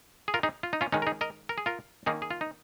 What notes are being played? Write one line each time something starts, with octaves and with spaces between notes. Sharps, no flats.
G#4
F4 A#4
D#4 G#4
F4
D#4
C#4 F4
D#3 G#3 C#4 D#4
A#4
D#4 G#4
A#4 D#5
A#4
G#4
F4 A#4
D#3 A#3 C#4 D#4 G#4
G#4
F4
D#4